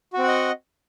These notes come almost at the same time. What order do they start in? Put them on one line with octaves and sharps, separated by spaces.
F#4 C4 F#5 D#5